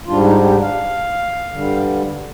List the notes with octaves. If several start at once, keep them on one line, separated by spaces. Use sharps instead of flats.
G#2 G3 D4 F4
D#4
G4
F5
G2 D3 G3